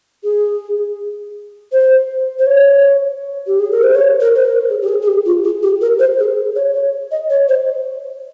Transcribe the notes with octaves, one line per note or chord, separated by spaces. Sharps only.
G#4
C5
C5
C#5
G4
G#4
A#4
C5
C#5
A#4
C5
A#4
G#4
G4
G#4
G#4
G4
F4
G#4
G4
A#4
C5
G#4
C#5
C#5
D#5
C#5
C5